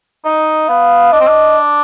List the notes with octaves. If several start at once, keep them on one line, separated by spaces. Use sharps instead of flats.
D#4 D#5
B3 F5
D4 D#5
C4
D4